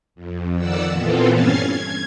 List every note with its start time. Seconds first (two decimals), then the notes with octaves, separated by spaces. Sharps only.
0.15 F2
0.56 F2 D#3 D5 F#5 E6
0.92 A#2 E3 B3 C4 F4 A4
1.33 G2 C#4 F6 G#6 A6 C7
1.70 G#6